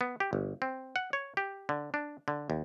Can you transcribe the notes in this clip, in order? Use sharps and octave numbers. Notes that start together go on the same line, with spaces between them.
B3
G4
G1
C4
F#5
C#5
G4
D3
D4
D3
D#2